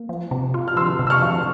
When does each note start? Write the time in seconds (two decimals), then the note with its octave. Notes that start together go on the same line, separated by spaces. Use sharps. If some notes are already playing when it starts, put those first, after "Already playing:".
Already playing: A#3
0.09 F3
0.31 C3
0.54 F4
0.68 F6
0.76 F3 C6 E6
0.99 C3
1.07 E6
1.10 C#6 F6
1.22 F3